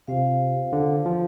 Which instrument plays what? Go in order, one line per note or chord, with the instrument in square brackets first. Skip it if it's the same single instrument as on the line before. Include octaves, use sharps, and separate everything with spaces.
[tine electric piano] C3 [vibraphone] F4 C5 F5
[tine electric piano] D3
F3